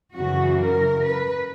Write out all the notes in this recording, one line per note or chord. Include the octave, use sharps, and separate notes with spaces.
F#2 C#3 E3 F#4
A#4
B4